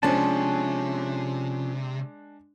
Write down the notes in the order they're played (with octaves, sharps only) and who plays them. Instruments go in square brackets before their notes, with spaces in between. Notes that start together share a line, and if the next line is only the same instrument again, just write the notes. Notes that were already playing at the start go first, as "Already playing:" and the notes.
[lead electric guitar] C3 [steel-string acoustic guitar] F3 C#4 [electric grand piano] G#3 D4 [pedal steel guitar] A5